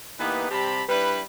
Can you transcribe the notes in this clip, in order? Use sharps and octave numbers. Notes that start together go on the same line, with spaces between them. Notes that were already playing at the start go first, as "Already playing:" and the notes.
E3 A#3 B3 D#4 G4 B4
C3 G3 C4 G4 A5 B5
G3 D4 E4 B4